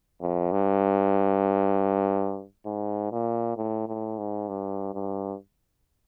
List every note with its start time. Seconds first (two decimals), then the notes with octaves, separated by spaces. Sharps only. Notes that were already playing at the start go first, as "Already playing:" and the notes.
0.21 F2
0.52 G2
2.65 G#2
3.12 A#2
3.57 A2
3.88 A2
4.18 G#2
4.49 G2
4.94 G2